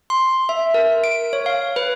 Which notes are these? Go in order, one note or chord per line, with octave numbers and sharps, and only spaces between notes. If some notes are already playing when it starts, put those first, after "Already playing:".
C6
E5
A#4
D7
C#5
F5
B4